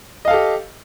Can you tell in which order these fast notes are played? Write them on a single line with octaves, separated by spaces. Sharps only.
D#5 F5 A4 G4